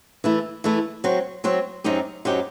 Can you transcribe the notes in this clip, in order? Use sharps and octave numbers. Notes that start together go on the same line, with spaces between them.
E3 A3 E4
E3 A3 E4
F#3 C4 F#4
F#3 C4 F#4
F#2 F#3 C4 D#4 G4
F#2 F#3 C4 D#4 G4